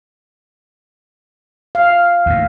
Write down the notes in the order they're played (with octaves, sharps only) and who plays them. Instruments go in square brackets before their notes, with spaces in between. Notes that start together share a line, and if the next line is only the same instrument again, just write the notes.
[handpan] F5
[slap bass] D#2 A2